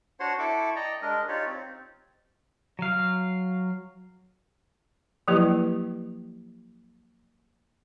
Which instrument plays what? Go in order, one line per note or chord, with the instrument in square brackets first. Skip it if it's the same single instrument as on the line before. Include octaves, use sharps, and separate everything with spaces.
[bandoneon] D4 F#4 C5 C#5 F#5 C6
E4 A4 A5 C#6 D6
D5 D#5 G5 A#5
G#3 D4 A#4 D#5
D#4 F4 G4 C#5 D5
C4
[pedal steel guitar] F#3 F5
[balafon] F3 F#3 A#3 E4 G4 B4